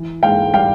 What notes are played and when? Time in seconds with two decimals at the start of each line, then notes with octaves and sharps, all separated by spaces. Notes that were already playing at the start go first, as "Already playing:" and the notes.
Already playing: E3
0.23 G#2 F5 G5
0.54 G3 F5 G5